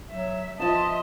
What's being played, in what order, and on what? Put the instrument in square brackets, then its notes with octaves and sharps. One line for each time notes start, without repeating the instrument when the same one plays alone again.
[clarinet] F#3 [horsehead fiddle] E5
[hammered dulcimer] F3 C6 [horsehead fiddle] D#5 E5 [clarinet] A5